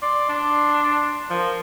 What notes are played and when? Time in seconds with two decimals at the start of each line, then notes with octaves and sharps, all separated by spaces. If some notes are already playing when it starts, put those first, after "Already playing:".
0.02 D5 C6
0.29 D4
1.30 F3 A#4